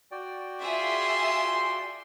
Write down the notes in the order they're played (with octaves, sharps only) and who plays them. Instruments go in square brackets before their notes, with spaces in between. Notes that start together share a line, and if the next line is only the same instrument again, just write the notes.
[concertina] F#4 D5 G5
[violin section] F4 G#4 E5 [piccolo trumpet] C6